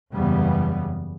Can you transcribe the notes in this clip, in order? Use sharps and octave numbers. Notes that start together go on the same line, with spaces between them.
F#1 E2 C#3 G3 B3